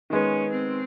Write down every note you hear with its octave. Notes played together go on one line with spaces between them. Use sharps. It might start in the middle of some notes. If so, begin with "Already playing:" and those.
D#3 G#3 B3 C#4
C4